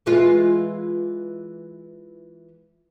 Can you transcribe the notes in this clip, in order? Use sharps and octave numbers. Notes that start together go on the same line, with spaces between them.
E3 G#3 F4